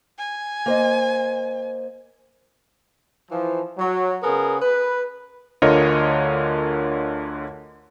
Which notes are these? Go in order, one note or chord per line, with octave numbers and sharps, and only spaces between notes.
G#5
A#3 C5 D#5
E3 F3
F#3
C#3 B3 G#4 A#4
B4
D2 D3 F4 A#4 C#5 D#5